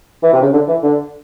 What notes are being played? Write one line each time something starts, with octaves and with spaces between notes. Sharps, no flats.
E3
C3
C#3
D3
E3
D3